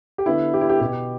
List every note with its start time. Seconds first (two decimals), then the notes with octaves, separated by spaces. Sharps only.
0.18 G4
0.26 D3 B3 E4
0.54 G4
0.61 E4
0.69 G4
0.80 B2 B3 G4